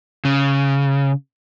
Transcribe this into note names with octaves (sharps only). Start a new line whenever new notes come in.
C#3